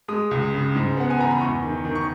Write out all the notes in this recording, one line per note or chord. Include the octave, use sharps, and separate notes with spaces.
G#3 D#6
C#2
C#3
G#2
B3 F#5
G#5
E3 A#5
B5
E2 C#6
D#3
D#3
C#6